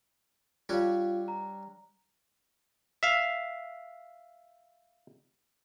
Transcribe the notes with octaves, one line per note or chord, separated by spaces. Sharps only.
G3 D4 F4 C#5 F5
A#5
E5 F5